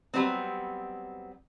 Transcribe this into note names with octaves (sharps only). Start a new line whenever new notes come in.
F#3 G3 B3 C4